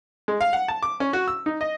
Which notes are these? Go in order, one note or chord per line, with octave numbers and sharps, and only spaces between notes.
G#3
F5
F#5
A5
D6
C#4
F#4
E6
D#4
D#5